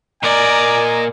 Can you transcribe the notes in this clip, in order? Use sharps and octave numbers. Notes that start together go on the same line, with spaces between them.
A#2 A#4 D5 D#5 G#5 A#5